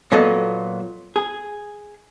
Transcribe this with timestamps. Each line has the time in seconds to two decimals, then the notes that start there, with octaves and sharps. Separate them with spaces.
0.12 A#2 F#3 A#3 B3 A4 D#5
1.16 G#4